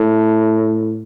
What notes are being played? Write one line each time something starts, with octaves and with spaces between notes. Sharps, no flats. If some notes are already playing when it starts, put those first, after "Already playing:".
Already playing: A2